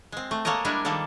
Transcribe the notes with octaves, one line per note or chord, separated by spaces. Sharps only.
G#3 C4
A3
G#3 A#3 A4 A#4 C#5 D#5
G3 G#3 D4 E4 A#4 G#5
D#3 F3 G3 A#3 A4